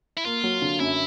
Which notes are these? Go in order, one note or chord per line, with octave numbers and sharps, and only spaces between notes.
E4
A#3 F4
F#3
D3
F#2 E4